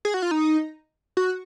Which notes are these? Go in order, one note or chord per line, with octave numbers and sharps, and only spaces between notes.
G#4
F#4
F4
D#4
F#4